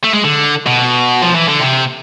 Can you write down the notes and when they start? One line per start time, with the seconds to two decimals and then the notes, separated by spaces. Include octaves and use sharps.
0.04 A3
0.14 G#3
0.24 D3
0.66 B2
1.22 F3
1.35 E3
1.48 D3
1.60 C3